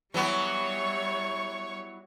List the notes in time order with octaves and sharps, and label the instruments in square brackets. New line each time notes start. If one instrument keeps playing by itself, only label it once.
[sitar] E3 F#3 B3 [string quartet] G3 C#5 C#6